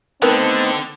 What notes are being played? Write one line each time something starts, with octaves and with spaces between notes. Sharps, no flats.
D3 D#3 A3 B3 C4 D#4 B4